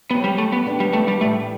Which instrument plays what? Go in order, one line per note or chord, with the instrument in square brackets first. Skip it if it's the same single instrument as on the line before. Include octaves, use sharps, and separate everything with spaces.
[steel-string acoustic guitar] F#3 C4 G4 [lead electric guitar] B3
[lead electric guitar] G3
A3
B3
[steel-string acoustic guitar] F#2 E3 B3 D4 G4
[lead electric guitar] G3
A3
G3
[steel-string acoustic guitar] A2 E3 G3 [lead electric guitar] A3